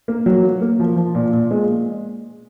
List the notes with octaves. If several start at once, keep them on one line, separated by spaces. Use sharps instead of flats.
A#3
F#3
A#3
A#3
F3
F3
A#2
A#2
G#3